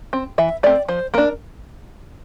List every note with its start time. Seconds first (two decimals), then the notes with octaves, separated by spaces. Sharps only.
0.13 C4
0.38 E3 E5
0.63 A3 C4 D5
0.88 F3 C5
1.14 A#3 D4 A#4